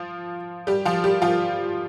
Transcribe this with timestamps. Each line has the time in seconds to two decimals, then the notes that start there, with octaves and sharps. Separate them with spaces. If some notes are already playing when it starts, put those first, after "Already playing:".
Already playing: F3 F4
0.67 G3 G4
0.85 F3 F4
1.04 G3 G4
1.22 F3 F4